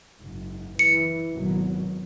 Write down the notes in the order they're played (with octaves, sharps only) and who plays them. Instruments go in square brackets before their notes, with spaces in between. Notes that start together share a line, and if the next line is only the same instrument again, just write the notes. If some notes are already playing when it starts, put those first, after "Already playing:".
[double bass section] F#1 G#2
[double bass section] E3 [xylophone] C#7
[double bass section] G#1 B2 F#3